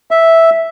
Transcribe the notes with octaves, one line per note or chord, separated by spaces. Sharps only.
E5